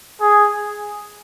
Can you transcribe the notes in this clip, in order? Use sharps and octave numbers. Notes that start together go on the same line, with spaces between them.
G#4